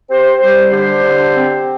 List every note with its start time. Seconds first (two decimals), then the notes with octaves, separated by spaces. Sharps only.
0.10 C4 G4 C5
0.41 G3 G4 C5
0.72 D3 G4 C5
1.04 D3
1.34 C4